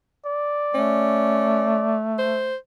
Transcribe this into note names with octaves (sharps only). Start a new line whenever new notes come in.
D5
A3 C#4
C5